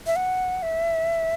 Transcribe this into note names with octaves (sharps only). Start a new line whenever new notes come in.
E5
F#5
E5